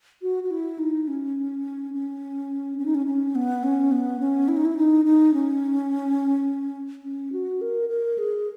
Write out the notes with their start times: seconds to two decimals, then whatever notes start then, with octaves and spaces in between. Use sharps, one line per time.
0.22 F#4
0.44 F#4
0.51 E4
0.79 D#4
1.08 C#4
1.93 C#4
2.78 C#4
2.86 D#4
2.95 C#4
3.07 C#4
3.35 B3
3.63 C#4
3.92 B3
4.20 C#4
4.48 E4
4.57 D#4
4.65 E4
4.77 D#4
5.05 D#4
5.34 C#4
7.04 C#4
7.32 F#4
7.61 A#4
7.89 A#4
8.18 G#4